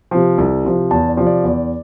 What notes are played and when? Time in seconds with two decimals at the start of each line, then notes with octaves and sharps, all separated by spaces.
0.11 C3 F3
0.38 C2
0.65 C3 F3
0.91 E2 A5
1.09 D5
1.17 C3 F3
1.27 D5
1.44 E2